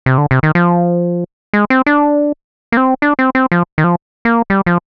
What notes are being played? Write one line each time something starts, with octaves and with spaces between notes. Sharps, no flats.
C3
D3
C3
D#3
F3
G#3
C4
D4
A#3
C4
D4
C4
C4
F3
D#3
F3
A#3
G3
F3